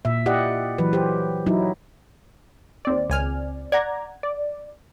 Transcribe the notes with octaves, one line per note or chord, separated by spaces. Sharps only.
A#2 E5
E4 G4 D5 D#5 F#5
E3 F#3 B4
G4 C5
F#3 D#4 E4
D#2 C4 D5
C#2 G#5 F6
D5 F#5 A#5 G#6
D5